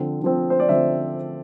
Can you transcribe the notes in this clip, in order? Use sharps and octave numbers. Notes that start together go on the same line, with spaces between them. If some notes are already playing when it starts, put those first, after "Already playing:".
Already playing: D3 F3 C4
D3 F3 C4
C5
D5
D3 F3 C4 E5